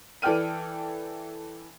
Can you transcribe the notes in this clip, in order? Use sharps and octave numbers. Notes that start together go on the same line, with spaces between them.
E3 A4 D5 G5 F6 D#7